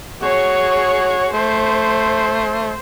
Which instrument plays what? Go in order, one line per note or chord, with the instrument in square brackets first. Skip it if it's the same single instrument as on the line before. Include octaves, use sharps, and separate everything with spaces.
[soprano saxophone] F#4 [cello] G#4 C#5
[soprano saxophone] A3 [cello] C5